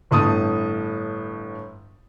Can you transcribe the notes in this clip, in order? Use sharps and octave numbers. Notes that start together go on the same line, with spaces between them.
G1 A2 A5 D#6